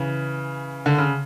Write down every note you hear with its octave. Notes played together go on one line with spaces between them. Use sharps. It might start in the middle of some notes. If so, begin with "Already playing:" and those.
Already playing: C#3 E3
D3
C#3